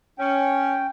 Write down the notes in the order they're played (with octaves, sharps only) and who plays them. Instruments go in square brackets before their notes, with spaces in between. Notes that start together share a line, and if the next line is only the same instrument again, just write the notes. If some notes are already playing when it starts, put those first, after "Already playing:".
[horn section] C#4 [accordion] G5